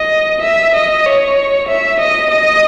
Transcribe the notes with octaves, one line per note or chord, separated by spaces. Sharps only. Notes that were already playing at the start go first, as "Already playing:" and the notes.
Already playing: D#5
E5
D#5
C#5
E5
D#5
D#5